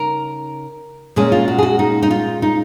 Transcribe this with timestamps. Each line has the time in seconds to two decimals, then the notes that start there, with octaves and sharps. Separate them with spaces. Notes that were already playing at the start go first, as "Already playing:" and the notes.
Already playing: C#3 D#4 A#4
1.16 A#2 G#3 C#4 G#4
1.32 F4
1.48 F#4
1.58 G#4
1.63 F#4
1.79 D#4
2.02 D#4
2.11 F4
2.42 D#4